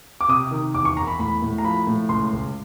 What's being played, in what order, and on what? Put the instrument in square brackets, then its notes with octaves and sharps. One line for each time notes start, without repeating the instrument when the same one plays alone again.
[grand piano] D6
C3 D#6
D#3
E2 D6
C#6
E2 A#5
B5
A2 B5
A2
A#5
F3 B5
A2
C#2 C6
C#2